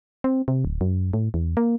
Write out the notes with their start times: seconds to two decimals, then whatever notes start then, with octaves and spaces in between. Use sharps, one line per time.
0.24 C4
0.48 C3
0.65 D1
0.81 F#2
1.13 A2
1.34 E2
1.57 A#3